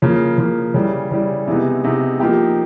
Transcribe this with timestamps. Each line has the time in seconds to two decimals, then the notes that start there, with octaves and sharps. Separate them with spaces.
0.02 C#3 F3 A#3
0.38 C#3 F3 A#3
0.74 C#3 E3 G3
1.11 C#3 E3 G3
1.47 C3 E3 G#3 B3 D#4
1.84 C3 E3 G#3 B3 D#4
2.20 F3 A#3 D#4 G4